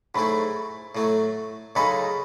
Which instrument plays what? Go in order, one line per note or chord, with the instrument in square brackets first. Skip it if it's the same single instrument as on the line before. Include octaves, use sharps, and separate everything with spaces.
[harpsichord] G#2 F#3 A3 E4 [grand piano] B5
[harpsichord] A2 F#3 A3
[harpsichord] F#2 C#3 G#3 D#4 A4 [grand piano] B5